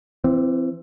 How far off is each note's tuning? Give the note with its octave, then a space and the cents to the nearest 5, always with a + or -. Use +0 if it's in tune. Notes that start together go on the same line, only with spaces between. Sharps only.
E3 +25 C4 -5